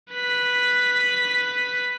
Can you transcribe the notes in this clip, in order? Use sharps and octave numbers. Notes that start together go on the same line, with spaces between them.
B4 B6